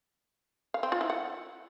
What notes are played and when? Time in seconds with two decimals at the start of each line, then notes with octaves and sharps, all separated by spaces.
0.74 F5
0.83 C4
0.92 F4
1.01 E4
1.10 F#5